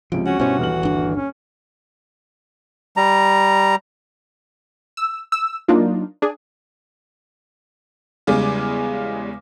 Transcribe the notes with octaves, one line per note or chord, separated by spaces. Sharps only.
C#2 C3 F3 D7
C#4 F#4
G2 B2 C#4 D4 E4 C5
D#1 E3 F6 F#7
G1 D4
C#4
G3 A#5
E6
E6
F#3 A#3 D4 D#4 F4
D4 G#4
E2 C#3 G3 G#3 G#5 D6